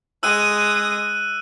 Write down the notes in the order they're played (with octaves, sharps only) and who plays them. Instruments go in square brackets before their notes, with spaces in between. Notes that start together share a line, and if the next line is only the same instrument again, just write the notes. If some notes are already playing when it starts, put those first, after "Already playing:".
[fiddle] G#3 D#6 [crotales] E6 F#6 D#7